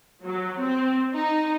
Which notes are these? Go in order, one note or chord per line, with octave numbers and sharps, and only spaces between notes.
F#3
C4
D#4